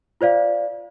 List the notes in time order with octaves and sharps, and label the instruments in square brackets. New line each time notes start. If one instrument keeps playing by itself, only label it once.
[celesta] F4 C5 D5 F5